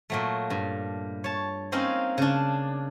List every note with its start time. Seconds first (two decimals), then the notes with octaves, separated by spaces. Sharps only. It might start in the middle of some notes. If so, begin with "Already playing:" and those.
0.10 A#2 F#3 A3
0.50 G2
1.24 C#5 A5
1.72 A#3 C4 C#4 D#4 G#4 F5
2.18 C#3 D4